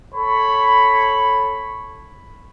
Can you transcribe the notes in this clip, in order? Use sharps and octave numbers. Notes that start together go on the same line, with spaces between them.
A4 C#5 B5